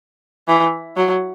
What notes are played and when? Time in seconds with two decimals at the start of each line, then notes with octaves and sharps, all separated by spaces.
0.48 E3
0.97 F#3